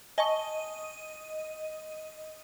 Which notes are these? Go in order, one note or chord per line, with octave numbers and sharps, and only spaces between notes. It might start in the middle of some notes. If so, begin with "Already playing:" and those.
D#5 G#5 A5 C#6